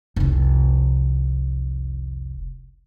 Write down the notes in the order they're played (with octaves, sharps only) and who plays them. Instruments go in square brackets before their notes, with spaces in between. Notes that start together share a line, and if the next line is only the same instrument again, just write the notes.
[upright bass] F1 C2